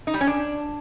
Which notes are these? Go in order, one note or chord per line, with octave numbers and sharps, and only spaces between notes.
D#4
G3
C#4
D4